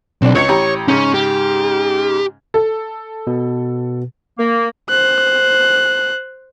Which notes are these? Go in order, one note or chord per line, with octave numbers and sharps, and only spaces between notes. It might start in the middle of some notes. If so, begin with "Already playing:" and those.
B1 C4 D4
C#2 C#5 G#6 C#7
A1 G4 A#5
G#2 C#3 C#4
G4
A4
B2
A#3
C5 F#6